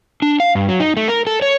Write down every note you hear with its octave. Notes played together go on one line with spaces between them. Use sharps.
D4
F5
G2
F#3
D#4
A3
A#4
A4
C#5